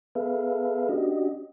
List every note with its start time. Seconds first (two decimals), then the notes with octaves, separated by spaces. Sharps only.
0.15 B3 G#4 A4 B4 E5 F5
0.89 C#4 D4 F#4 G4 D#5